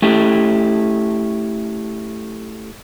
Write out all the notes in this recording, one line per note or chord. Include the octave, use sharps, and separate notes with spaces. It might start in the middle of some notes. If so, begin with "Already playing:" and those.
A3 C#4 E4 G4